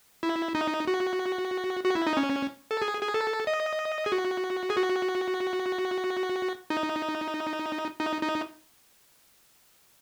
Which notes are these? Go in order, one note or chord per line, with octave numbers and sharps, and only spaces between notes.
E4
D#4
F#4
F#4
E4
D#4
C#4
A4
G#4
G#4
A4
D#5
G#4
F#4
G#4
F#4
D#4
D#4
D#4